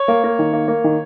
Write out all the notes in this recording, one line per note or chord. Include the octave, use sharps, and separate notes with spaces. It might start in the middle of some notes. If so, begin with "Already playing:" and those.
Already playing: C#5
A#3
A#3
D#3
A#3
A#3
D#3